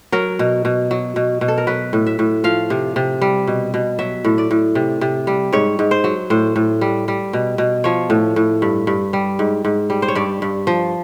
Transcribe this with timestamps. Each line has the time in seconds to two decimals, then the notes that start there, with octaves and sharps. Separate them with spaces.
0.12 F#3 A#4
0.39 B2
0.65 B2
0.91 F#3
1.16 B2
1.41 B2
1.48 A4
1.58 A#4
1.67 F#3 B4
1.93 A2
2.07 E5
2.19 A2
2.44 F3 F5
2.70 C3
2.96 C3
3.21 G3
3.47 B2
3.74 B2
3.99 F#3 E5
4.24 A2
4.38 D5
4.51 A2
4.75 C3
5.01 C3
5.27 G3
5.53 G#2 C#5
5.79 G#2
5.91 C5
6.04 F#3
6.30 A2 C5
6.56 A2
6.81 G3
7.08 G3
7.33 B2
7.58 B2
7.84 F3 C#5
8.10 A2
8.36 A2
8.62 G2
8.87 G2
9.13 G3
9.39 G#2
9.65 G#2
9.90 G3
10.02 C5
10.08 C#5
10.15 G2 D5
10.42 G2
10.67 F3